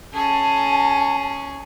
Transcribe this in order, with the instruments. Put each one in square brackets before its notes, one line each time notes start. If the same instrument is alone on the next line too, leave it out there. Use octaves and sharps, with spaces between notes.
[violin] C#4 G#4 [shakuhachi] A5